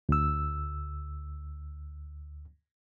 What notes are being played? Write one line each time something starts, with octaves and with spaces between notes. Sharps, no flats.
D2 E6